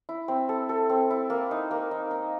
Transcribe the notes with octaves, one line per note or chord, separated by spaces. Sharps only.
E4
C4
A4
A4
C4
E4
A#3
D#4
A#3
D#4
D#4